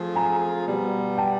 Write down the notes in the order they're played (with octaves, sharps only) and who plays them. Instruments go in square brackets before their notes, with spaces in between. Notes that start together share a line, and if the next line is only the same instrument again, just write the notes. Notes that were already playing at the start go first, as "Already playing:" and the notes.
Already playing: [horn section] F3 A3 C4 F4 G#4
[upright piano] G#5 A#5
[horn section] B2 G3 B3
[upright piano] G5 A5